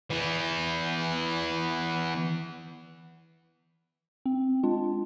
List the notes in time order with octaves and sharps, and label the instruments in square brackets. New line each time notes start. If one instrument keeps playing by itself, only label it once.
[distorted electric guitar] E3 B3
[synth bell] C4
G#3 D4 F4